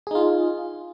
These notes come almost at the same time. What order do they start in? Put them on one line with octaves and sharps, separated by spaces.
G#4 D#4 F4